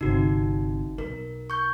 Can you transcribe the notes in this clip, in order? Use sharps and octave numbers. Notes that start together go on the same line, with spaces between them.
G1 C3 D#4 F#4
B1 A#4
C#6 G6